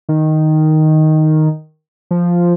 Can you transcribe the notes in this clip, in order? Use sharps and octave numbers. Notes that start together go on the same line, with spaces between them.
D#3
F3